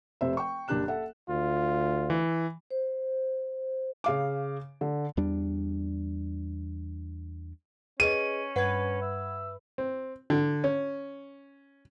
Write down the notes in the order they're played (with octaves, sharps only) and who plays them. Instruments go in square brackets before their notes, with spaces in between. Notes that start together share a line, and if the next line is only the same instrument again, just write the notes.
[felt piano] F1 C3 C5 E5
G5 C#6
F#1 A#3 D4 G4 F#6 E7
A4 E5 F#5
[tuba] D2 [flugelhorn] F4
[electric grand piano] E3
[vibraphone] C5
[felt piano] C#3 F5 D6
D3
[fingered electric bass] E2 G3 D4
[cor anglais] C#4 [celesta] G#4 B4 D#5 [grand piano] D#7
[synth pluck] G2 B4 [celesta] F#5 G#6
[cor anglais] E5
[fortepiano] C4
D3
C#4